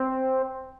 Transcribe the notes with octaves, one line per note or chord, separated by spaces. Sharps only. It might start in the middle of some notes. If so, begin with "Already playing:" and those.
Already playing: C4